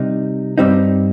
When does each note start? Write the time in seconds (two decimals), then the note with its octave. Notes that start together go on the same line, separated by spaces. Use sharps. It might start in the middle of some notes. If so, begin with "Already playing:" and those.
Already playing: C3 G3 D#4
0.58 G2 G3 C4 D#4